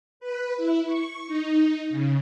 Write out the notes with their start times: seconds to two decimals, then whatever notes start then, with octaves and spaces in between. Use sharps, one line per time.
0.20 B4
0.57 E4
0.86 C#6
1.27 D#4
1.90 C#3